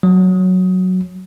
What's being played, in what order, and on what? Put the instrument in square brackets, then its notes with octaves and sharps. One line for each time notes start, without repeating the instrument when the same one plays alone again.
[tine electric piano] F#3